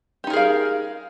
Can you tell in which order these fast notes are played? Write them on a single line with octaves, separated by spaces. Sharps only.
G4 D#4 A#4 G#4 F5